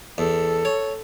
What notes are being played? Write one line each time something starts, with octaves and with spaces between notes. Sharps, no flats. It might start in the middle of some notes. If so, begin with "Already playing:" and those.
E2 A4
C#5